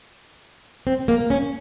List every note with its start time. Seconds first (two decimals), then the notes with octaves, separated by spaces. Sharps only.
0.87 C4
1.08 A#3
1.30 C#4